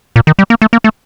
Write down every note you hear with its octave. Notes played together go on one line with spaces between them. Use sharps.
A#2
D#3
G3
A#3
A3
A#3
A3